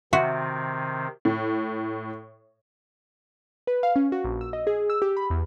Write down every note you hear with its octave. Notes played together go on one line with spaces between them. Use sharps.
C3 D#3 C4 F#4 E5 C6
A2
B4
F5
C#4
F#4
A#1
E6
D#5
G#4
E6
G4
B5
E2